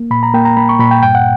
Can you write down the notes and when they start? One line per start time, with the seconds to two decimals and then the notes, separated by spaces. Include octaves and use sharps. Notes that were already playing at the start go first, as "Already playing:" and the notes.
Already playing: A#3
0.11 A#2 B5
0.23 A#5
0.34 A#3 G5
0.45 A#5
0.57 A#3 B5
0.69 C#6
0.80 A#2 B5
0.91 G5
1.03 G2 G5
1.15 F#5